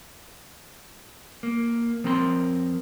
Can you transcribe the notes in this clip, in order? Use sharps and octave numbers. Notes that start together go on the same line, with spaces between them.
A#3
F3 C4 A#4 B5 C6